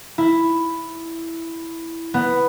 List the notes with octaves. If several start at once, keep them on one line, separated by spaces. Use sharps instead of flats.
E4
B3